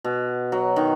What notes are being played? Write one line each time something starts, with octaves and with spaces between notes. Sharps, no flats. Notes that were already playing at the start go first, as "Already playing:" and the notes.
B2
F#3
D#3